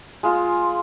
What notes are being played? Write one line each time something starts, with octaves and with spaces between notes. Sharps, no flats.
G#3 F4